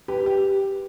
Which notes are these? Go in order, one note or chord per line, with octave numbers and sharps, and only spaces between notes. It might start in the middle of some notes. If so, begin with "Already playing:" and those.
G4 B4
G4